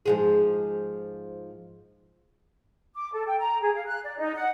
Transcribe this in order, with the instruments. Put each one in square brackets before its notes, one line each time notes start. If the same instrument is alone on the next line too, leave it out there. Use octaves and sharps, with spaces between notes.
[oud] G#2 F3 G#4
[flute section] D6
A4
G5
A#5
G#4
F5
F#6
D5
D#4
F#5